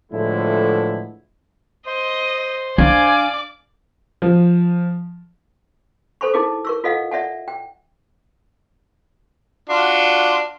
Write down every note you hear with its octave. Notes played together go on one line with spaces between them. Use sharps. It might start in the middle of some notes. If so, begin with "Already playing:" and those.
A2 D3 E3 F3 G#3 E4
C5 D#5 C6
D4 D5 F5 G#5 D6
F3
A4 C5 G#5 B5 C#6
D#4 E4 G#4 A#4 D6
A#4 C#6 E6
F4 A4 D#5 F5 F#5
D5 E5 F#5 G#5
G5
D4 F4 F#4